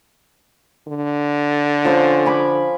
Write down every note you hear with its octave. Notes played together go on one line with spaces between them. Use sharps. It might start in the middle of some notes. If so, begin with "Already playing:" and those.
D3
F3 C#4 C5
G#5 B5 D6